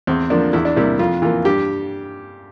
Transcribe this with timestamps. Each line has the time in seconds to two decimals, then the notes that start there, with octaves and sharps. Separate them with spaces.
0.07 E2 C4
0.30 D3 F3 A#3 D4
0.53 E2 E4
0.65 D4
0.76 C3 G3 A#3 E4
0.99 F2 F4
1.22 E3 A#3 F4
1.45 G2 G4